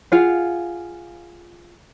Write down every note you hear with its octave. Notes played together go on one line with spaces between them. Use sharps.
F4 G#4 F5 F#5